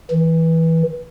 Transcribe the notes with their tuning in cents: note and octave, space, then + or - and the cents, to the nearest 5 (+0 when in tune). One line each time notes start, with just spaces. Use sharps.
E3 -15